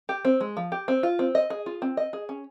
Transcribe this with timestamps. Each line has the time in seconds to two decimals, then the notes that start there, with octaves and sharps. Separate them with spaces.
0.09 G4
0.25 C4
0.41 G#3
0.57 F3
0.72 G4
0.88 C4
1.03 F4
1.19 C4
1.35 D#5
1.50 G#4
1.66 F4
1.82 C4
1.97 D#5
2.13 G#4
2.29 C#4